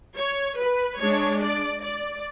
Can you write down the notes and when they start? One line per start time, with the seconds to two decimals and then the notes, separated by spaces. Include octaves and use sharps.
0.16 C#5
0.58 B4
0.99 G#3 D4 C#5
1.42 D5
1.82 D5